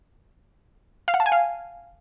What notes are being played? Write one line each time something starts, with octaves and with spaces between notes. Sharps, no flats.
F5
F#5
A5
G#5
F5